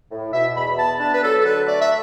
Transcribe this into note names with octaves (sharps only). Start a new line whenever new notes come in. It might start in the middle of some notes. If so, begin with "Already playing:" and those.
A2
B2 E5
E2 B5
B3 A5
D4 A5
B4
F#3 A4
A4
D3 B4
A3 D5
E5